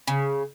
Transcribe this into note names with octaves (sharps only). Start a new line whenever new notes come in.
C#3